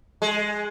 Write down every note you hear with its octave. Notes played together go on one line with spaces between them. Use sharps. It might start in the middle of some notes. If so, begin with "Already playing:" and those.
G#3